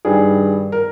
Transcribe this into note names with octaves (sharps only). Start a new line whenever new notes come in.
G2 D#3 G3 G#4
A#4